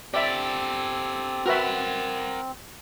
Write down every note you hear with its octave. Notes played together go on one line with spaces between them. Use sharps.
C4 G4 A4 D5 E5
F#4 A#4 B4 E5 F#5